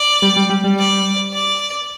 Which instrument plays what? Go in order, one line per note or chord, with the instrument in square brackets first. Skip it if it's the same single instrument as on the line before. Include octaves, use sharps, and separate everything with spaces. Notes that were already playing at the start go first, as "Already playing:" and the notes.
Already playing: [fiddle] D5
[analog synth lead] G3
G3
G3
G3
[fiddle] D5
D5